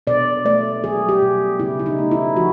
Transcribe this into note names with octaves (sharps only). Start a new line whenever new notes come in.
B2 D5
A3 D5
F#3 G#4
G4
B2
C#3 E4
E4
D#4
A3
E4
F3 F#4